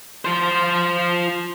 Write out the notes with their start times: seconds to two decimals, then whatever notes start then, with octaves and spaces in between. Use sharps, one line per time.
0.25 F3 C5